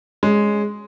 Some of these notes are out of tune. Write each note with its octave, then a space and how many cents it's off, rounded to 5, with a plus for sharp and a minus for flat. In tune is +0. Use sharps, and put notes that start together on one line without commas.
G#3 +0 C#4 +10